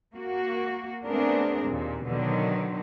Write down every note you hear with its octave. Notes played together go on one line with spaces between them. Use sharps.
A#3 F#4
A3 B3 C4 D4 G#4 A#4
D#2 A#2
B2 D3 D#3 F#3